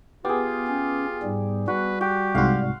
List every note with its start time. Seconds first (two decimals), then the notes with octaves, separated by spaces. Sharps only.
0.25 B3 F4 G4 G#4
0.67 C#4
1.23 G#2 G3
1.68 G3 F#4 B4
2.01 F#4 G4 G5
2.35 C2 G#2 F#4 F5 F#5 C6